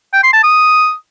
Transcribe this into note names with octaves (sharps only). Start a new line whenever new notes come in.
G5
C6
A5
D#6